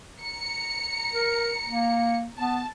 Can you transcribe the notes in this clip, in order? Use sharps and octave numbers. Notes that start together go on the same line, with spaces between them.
A#5 C#7
A#4
A#3
B3 A5